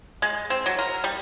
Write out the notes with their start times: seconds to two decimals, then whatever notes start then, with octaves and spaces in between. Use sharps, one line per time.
0.22 G#3
0.50 C4
0.66 F#3
0.79 A#4
1.04 G3